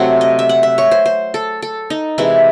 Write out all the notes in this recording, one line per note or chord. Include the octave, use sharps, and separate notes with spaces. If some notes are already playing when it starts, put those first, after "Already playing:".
Already playing: C3 F#3 A3 C4 F#5
D#5
E5
F#5
E5
C#5
C5
C5
A4
A4
D#4
C3 E3 G#3 E4